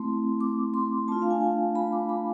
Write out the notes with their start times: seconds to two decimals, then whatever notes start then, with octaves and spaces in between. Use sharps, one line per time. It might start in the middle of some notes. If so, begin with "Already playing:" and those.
Already playing: A3 C4 E4 C6
0.41 D6
0.74 C6
1.08 A3 D4 F4 A5
1.22 F5
1.30 G#5
1.75 B5
1.92 D6
2.09 B5